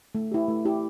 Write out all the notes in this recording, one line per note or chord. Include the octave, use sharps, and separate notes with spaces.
A3
E4 G4
A3
E4 G4